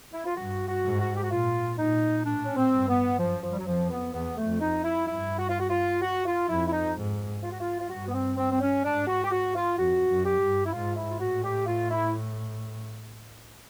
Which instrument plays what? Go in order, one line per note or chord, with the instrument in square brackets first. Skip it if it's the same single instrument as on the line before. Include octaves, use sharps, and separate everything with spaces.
[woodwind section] E4
F4
[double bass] G2 [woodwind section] F#4
[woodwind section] F#4
[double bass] G#2
[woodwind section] F#4
G4
F#4
[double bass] A#2 [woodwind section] F4
[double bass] A#2 [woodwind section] D#4
[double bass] A2 [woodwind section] D4
[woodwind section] C#4
C4
[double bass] G2
[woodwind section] B3
[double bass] F#2 [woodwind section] F3
[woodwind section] F3
G3
F#3
[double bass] F2 [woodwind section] F3
[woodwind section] B3
[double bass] E2 [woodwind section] B3
[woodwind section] A3
[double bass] F2
[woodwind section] D#4
E4
[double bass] G2 [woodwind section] E4
[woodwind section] F#4
F4
F#4
F4
F#4
F4
[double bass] F2 [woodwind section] E4
[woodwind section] E4
D#4
[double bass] G#2
[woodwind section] F4
F#4
F4
F4
[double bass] G2 [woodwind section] F#4
[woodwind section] B3
C4
C4
C4
C#4
[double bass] G#2 [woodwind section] D4
[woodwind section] F#4
G4
F#4
F4
[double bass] F2 [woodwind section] F#4
[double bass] F#2
[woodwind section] G4
[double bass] G2
[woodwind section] E4
[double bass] G#2 [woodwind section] F4
[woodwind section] E4
F4
[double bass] A2 [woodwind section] F#4
[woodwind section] G4
F4
E4